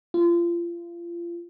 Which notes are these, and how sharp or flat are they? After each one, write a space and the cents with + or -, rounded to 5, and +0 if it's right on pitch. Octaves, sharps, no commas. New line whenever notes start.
F4 -30